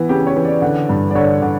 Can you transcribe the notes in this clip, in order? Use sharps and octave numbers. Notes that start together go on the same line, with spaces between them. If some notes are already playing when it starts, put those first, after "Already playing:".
Already playing: E3 B3
C#3 G4
C#5
E3
D5
D3
G2
D5
D3 C#5
D3